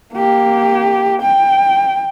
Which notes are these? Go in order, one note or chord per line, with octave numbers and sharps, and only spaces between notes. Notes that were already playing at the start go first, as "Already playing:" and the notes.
A#3 G4
G5